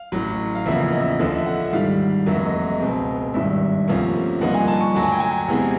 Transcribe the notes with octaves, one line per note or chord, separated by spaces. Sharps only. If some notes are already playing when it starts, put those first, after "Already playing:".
Already playing: F5
A1 A2 F#3
F5
E2 C#3 F3 A#3 E5
D#5
E5
D#5
D2 D3 F3 A3 D#5
E5
F#5
E5
G#2 D#3 G3 F5
F1 F2 D3 F#3 A#3 E5
D#5
D#5
C#2 B2 G#3 C4 D#5
G#1 G2 D#3 E5
D2 C3 F3 A#3 C#4
G2 D3 F3 A#3 D#4 F#5
G#5
A5
C#6
D2 D3 F#3 A5
G#5
G5
G#5
E2 C3 E3 G#3 B3